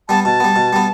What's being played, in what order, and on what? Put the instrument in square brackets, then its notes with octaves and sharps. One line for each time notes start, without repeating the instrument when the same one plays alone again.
[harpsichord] G3 B3 [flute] A5
[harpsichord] B2 [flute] A5
[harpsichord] G3 B3
B2
G3 B3